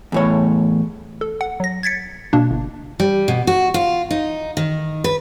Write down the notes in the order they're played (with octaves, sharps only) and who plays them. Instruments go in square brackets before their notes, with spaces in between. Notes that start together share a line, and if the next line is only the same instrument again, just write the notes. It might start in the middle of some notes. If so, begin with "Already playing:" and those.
[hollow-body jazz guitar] E2 A2 C#5
[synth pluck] A4
F#5
F#3 A#6
G#6 A6 B6 C#7
B2 A#3 D4
G1
[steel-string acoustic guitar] G3
B2
F#4
F4
D#4
D#3
B4